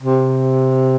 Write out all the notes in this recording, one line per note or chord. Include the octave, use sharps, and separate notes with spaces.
C3